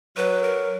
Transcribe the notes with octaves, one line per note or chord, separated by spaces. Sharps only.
F#3 B4
A#4